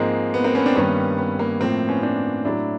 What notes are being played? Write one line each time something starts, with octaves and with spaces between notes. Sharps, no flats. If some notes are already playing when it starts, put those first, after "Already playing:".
Already playing: G#2 F3 G#3 A#3 C4
B3
A#3 C4
B3 C#4
C4 D4
G2 D#3 G3 A#3 B3 C#4
B3
A#3
A2 F3 A3 A#3 C4
B3 C#4
C4 D4
A2 F#3 A3 D4 E4